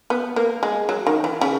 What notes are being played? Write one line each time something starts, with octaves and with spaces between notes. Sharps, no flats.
B3
A#3
G#3
F#3
D#3
E3
C#3